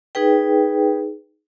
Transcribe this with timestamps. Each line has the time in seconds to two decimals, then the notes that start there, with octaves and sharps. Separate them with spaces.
0.15 D#4 G#4 B4 G5